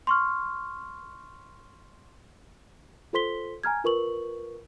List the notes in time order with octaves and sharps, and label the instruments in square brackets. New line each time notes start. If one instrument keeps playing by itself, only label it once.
[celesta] C6 C#6 F6
F4 A4 C5 C6 B6 G7
G#5 A#5 F6 G#6
F4 A#4 B4 C#6 F#7